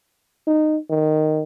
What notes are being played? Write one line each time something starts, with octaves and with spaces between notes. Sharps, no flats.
D#4
D#3